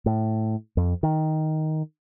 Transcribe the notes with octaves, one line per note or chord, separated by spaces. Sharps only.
A2
F2
D#3